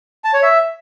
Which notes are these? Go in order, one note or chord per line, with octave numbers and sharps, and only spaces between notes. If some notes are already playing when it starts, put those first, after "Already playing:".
A5
C#5
E5